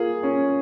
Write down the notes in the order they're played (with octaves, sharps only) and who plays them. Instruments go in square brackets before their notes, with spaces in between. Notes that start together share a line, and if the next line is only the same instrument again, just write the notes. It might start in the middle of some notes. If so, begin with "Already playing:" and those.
Already playing: [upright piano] A#3 F4 G#4
C#4